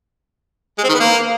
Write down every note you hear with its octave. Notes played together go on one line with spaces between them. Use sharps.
G#3
C4
D#3
B3
A#3